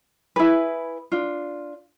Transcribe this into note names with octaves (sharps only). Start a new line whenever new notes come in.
E4 G#4 B4
D4 F4